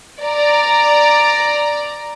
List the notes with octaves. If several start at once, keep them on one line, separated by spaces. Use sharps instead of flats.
D5 A#5